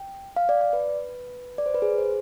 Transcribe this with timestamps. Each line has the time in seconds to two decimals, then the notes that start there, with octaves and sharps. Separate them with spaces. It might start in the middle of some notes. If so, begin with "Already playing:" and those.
Already playing: G5
0.36 F5
0.49 D5
0.61 D5
0.73 B4
1.58 D5
1.66 C5
1.74 B4
1.82 G#4
1.98 C5